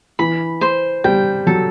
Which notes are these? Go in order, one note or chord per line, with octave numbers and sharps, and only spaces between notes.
E3 B5
C5
G3 G5
F#3 A4